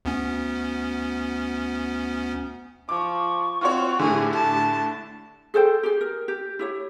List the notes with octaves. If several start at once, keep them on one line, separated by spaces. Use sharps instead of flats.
D2 B3 C#4
F3 C#6 D6
C4 F4 F#4 C#5
A2 D3 G4 G#4
A5
G#4 A4 C5 G5
G4 G#4
A#4
G4
E4 G4 C#5